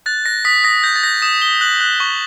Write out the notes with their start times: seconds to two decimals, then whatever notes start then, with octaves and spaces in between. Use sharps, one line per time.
0.06 F#6 A6
0.26 F#6 A#6
0.45 D#6 B6
0.64 D#6 A#6
0.83 G6 A#6
0.96 A6
1.03 G6 A#6
1.22 D#6 E7
1.42 D#6 G7
1.61 F#6 F#7
1.80 F#6
2.00 C#6